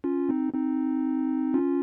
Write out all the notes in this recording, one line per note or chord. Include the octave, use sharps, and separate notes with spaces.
C#4 F4
C4 D#4
C4 D#4
C#4 F4